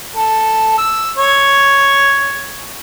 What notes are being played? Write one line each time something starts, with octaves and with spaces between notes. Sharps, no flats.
A4
E6
C#5